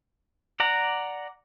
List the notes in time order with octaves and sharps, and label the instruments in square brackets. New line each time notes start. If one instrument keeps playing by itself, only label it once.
[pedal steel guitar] D5 F#5 A#5